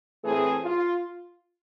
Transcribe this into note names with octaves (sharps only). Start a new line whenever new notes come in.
A2 E3 A3 C4 G#4
F4